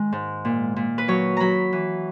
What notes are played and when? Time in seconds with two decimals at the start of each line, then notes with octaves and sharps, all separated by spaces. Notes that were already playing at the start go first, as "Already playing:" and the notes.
Already playing: D#3 G#3
0.12 G#2
0.45 A#2
0.76 A#2
0.98 B4
1.08 F#3 C#5
1.37 F#3 A#5 B5
1.73 E3